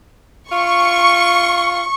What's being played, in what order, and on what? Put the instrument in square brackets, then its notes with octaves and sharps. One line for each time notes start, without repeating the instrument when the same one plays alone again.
[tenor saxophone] F4 [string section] C#6